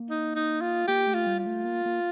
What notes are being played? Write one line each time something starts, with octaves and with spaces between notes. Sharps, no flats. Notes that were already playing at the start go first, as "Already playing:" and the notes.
Already playing: A#3
D#4
D#4
F4
A#3 G4
A3
F4
G3
F4
A3
A#3
A#3